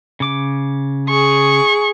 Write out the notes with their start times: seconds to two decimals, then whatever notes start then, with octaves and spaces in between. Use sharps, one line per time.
0.20 C#3 D6
1.10 G#4 C#6